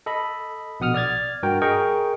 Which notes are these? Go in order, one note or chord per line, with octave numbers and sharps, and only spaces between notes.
A4 D#5 B5
A#1 B2 F#5 D#6 F6
D5 F6 G#6 A6
G2 F#4 A#4 G5
G#4 A#4 D#5 G5 C#6